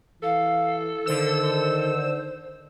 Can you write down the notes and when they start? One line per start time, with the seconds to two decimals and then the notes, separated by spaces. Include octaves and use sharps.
0.23 E3 A4 F5
1.06 D3 D#3 C5 E6